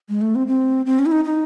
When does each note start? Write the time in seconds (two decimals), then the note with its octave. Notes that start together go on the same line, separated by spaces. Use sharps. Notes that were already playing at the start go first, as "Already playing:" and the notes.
0.09 G#3
0.21 A3
0.35 C4
0.47 C4
0.86 C4
0.99 C#4
1.06 E4
1.12 D#4
1.25 D#4